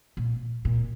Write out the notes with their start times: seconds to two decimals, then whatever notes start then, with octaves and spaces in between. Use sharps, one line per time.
0.17 A#2
0.65 A#2